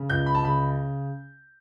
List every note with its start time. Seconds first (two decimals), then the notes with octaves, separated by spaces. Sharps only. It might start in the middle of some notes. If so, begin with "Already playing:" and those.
Already playing: C#3
0.09 C#2 G6
0.26 B5
0.35 A5
0.43 C#3 B5